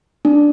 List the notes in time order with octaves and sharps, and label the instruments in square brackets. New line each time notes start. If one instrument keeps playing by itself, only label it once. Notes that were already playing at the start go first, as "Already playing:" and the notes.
[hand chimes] D4